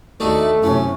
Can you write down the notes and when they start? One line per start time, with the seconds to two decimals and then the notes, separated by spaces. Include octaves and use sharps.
0.20 D#2 A3 D4 D#4 F#4
0.63 F#2 A2 C3 C#4